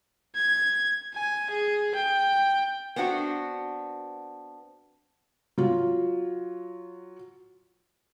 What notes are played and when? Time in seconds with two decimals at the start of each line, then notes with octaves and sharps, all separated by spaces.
0.35 G#6
1.14 G#5
1.51 G#4
1.95 G5
2.96 B3 C4 D4 F#4
5.58 F#3 F4